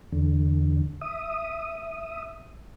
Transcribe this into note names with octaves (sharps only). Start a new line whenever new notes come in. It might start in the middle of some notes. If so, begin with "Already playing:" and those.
E2 D3
E5 D#6